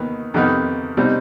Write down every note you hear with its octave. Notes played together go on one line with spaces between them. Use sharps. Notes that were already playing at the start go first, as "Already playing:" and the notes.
Already playing: D#2 D#3 B3
F2 C3 D#3 B3 D#4
B2 G3 C4 D#4